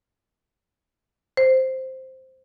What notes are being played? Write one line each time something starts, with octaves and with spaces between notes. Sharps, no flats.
C5